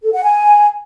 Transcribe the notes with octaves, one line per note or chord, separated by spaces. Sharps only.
A4
F#5
G#5